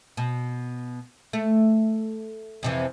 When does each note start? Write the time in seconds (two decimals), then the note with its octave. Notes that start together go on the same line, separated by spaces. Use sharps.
0.17 B2
1.33 A3
2.63 F2 C3 E3